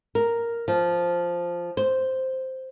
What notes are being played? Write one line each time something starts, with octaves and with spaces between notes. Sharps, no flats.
A#4
F3
C5